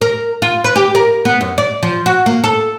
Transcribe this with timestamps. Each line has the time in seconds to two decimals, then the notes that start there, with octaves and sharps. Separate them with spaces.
0.01 A#4
0.42 F4
0.64 B4
0.76 G4
0.95 A#4
1.25 B3
1.41 F#2
1.58 D5
1.83 F3
2.06 F#4
2.26 A#3
2.44 A4